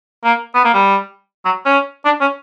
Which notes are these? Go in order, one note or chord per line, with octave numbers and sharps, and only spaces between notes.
A#3
B3
A#3
G3
F#3
C#4
D4
C#4